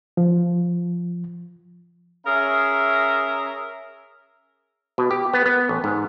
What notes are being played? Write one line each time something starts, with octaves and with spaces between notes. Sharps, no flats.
F3
C#4 G#4 A#4 E5 A#5
B2
G4
B3
B3
A1
G#2